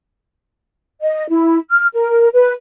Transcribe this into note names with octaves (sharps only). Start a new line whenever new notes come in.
D#5
E4
F6
A#4
B4